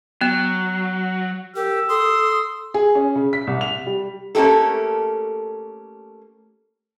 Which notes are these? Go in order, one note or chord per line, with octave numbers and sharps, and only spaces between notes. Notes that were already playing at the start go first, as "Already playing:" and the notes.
F#3 B3 F#6
G4 A#4 E6
A4 C6 D#6
G#4
C#4
C#3
B6
C2
F7
G3
A3 A#3 C#4 D#4 G4 A4